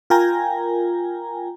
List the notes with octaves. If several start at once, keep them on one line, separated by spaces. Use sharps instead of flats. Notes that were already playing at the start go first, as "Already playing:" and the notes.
F4 A#4 G5 G#5 A#5